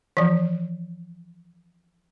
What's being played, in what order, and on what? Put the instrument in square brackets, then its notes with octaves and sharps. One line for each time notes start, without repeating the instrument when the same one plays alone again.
[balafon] E3 F3